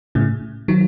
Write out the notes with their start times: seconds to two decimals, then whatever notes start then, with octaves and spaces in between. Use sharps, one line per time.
0.15 A2 C#3
0.68 D#3 F#3